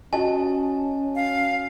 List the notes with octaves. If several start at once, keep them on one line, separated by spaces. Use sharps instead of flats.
C#4 F#4 D#5 G#5 A5
F5